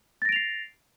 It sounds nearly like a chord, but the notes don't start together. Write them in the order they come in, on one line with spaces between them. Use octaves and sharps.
A6 A#6 D7 F7 C7